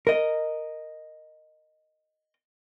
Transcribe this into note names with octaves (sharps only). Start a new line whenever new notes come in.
A#4 D#5